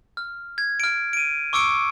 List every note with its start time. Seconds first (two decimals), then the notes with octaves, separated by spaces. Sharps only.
0.17 F6
0.58 G#6
0.80 F6 D7
1.13 D7 D#7
1.53 C#6 D6 E6 C#7 D7